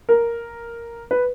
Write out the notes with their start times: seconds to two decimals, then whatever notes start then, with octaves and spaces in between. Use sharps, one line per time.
0.09 A#4
1.11 B4